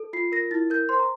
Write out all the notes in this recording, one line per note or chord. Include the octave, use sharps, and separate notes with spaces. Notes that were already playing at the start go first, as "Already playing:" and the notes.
Already playing: A4
F4 C7
A#4 A#6
E4 A6
A#4 G6
C5 C6
A#5